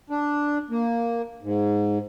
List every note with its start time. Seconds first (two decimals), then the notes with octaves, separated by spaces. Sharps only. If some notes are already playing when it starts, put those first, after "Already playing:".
0.10 D4
0.70 A#3
1.43 G#2